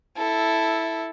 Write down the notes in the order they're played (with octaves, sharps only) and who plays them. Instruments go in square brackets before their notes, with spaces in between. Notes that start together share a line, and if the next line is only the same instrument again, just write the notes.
[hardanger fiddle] E4 A4